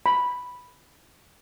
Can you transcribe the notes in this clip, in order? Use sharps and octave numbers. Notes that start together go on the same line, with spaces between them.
B5